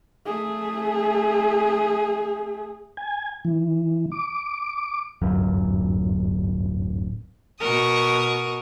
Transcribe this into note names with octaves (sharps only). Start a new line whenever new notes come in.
A3 G#4
G#5
E3
D6
D1 G1 F#2
B2 F#4 A#4 C#6 D#6